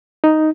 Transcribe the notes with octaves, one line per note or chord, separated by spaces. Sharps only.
D#4